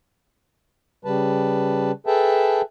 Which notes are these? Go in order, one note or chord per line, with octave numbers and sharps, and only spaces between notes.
C#3 G3 B4 A5
G#4 A4 B4 E5 G5 A5